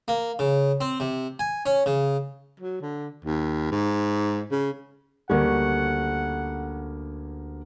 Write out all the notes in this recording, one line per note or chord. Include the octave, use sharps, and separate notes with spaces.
A#3
C#3
C4
C3
G#5
C#4
C#3
F#3
D3
D#2
G#2
C#3
D2 G3 A#3 C#4 F#5